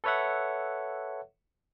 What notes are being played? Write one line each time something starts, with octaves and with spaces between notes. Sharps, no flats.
A4 B4 C#5 E5 F#5